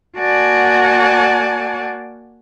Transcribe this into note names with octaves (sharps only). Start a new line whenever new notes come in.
A#3 F#4 D5 F#5 G#5 A5